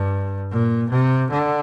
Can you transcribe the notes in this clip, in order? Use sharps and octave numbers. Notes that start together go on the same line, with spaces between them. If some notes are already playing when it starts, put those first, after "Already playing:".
Already playing: G2
A#2
C3
D3